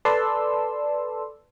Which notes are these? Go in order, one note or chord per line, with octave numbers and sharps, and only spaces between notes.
A4 B4 D5 A5 C6 E6